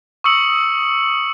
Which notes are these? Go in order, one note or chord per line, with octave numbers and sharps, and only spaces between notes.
C#6 D#6 E6 C#7 F#7